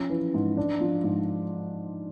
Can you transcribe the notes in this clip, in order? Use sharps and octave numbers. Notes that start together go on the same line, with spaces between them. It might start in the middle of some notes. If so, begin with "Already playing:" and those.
Already playing: F3 C#4
E3
G#2
D4
F3
G#2